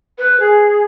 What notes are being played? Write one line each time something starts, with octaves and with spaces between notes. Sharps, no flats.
B4
G#4